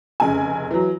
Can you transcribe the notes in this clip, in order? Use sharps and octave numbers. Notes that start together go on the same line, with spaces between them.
F1 C#3 G#5
E3 F#3